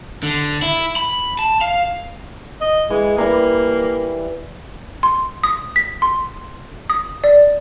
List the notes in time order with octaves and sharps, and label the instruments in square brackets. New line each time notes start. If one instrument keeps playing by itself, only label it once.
[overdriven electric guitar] D3
E4
B5
A5
F5
[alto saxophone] D#5
[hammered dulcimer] E3 [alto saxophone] G#3
[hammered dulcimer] E3 G3 A#5 [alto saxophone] A#3
[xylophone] C6
D#6
B6
C6
D#6
D5